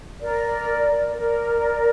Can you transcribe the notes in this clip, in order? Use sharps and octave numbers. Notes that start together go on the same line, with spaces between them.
A#4 D5
A#4 D5